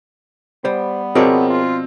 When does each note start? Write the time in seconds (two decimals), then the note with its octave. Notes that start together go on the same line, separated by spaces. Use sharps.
0.65 G3 B3 C5
1.15 B2 F3 C4 G#4 A#4 C#5 D5
1.50 F4